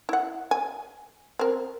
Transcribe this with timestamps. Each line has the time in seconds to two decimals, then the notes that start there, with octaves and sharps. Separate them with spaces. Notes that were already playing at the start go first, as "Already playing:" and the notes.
0.09 E4 F#5
0.51 G#5
1.39 C4 A#4